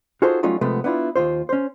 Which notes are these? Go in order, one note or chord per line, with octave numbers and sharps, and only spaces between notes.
D#4 F4 F#4 G#4 A4 C5
F#3 G3 A3 C#4 D#4 F4
C3 F3 G#3 A3 B3
B3 D4 E4 F4
D#2 G#2 F4 C5
C#4 C5